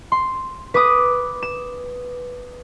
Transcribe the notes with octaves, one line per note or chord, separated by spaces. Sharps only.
C6
B4 D6 D#6
E7